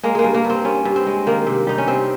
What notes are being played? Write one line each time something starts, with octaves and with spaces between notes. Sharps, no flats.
G#3 A#3
G#3 A#3
G2
A#3
G2
C4
G2 C#4
G2
C4
G#3
D#3 A#3
C3
G3 D#4
C#4
C3 C4